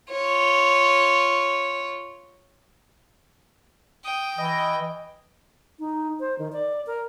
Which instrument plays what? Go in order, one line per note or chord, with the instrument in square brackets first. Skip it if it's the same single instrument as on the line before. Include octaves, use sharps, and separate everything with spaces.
[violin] F4 C#5
[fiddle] G5 [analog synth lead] D#6
[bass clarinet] E3 [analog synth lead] D#5
[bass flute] D#4
C5
D#3
D5
A#4